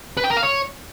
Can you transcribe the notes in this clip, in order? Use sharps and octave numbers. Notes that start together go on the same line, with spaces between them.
B4
G5
A#4
F5
C#5